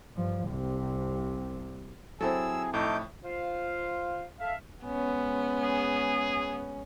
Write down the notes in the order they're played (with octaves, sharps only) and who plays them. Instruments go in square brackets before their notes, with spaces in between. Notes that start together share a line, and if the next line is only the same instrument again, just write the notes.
[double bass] G2 F3
C2 C3
[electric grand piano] F#3 [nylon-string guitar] C4 E4 A4 [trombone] G#4 [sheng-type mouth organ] E6
[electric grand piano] F2 A2 [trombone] A3 [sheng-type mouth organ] D#4 D6 G6
[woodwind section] F4 C5 F5
A4 E5 F5
[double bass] G#3 C#4 [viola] B3
[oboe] G#4